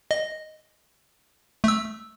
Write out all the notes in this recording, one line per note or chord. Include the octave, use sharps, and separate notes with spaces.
D#5
A3 E6